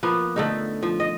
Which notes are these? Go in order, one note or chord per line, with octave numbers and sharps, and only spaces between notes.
F3 A#3 B3
D3 A3 D#4
F3
D#5